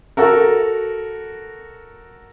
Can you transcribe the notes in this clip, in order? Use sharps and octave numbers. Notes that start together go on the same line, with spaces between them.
F#4 A4 A#4